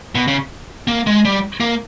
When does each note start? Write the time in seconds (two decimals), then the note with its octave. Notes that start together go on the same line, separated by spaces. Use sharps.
0.15 B2
0.28 C#3
0.88 A#3
1.07 G#3
1.25 G3
1.60 A#3